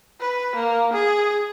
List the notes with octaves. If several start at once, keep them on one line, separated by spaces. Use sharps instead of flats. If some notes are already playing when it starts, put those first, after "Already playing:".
B4
A#3
G#4